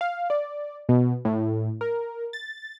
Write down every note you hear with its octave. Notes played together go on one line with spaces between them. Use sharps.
F5
D5
B2
A2
A#4
A6